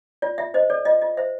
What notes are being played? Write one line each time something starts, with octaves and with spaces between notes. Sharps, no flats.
F4 D5
F4 E5
C5 D#5
A4 D5
F4 D#5
F4 D#5
C5 E5